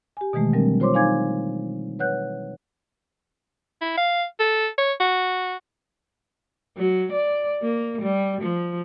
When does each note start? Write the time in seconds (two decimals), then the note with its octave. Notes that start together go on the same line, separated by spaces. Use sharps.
0.17 G4 G#5
0.33 B2 D#3 E3 G#3 A3
0.53 F#3 G3 C4 D4 A#4
0.80 F4 C5 C#5 C6 D6
0.94 D#4 F5 G#5 D6 G#6
1.99 B4 C#5 F#5 F#6 G6
3.81 E4
3.98 F5
4.40 A4
4.78 C#5
5.00 F#4
6.77 F#3
7.12 D5
7.62 A#3
8.02 G3
8.41 F3